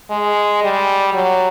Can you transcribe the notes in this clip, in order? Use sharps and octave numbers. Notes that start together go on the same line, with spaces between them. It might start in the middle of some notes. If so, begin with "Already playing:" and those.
G#3
G3
F#3